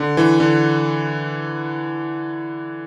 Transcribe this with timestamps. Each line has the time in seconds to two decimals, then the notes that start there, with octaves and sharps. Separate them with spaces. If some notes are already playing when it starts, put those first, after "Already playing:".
Already playing: D3
0.17 E3
0.40 D3